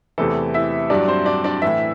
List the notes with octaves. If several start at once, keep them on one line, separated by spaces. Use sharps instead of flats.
E2 C3 E3 A3 A4
E4 E5
G2 F#3 D4 D5
C4 C5
D4 D5
D4 D5
A2 E3 E4 E5